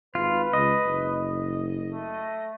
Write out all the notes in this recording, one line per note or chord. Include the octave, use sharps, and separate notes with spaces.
G#1 F4 B4
C#2 D#5
F#1
A3